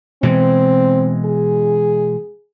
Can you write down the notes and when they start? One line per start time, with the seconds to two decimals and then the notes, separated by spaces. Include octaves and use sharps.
0.23 B2 E3 G#3 C4
1.25 G#4